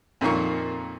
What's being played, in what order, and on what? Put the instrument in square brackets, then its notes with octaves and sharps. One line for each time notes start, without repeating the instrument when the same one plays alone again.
[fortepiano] F2 A#2 D#3 A#3 C#6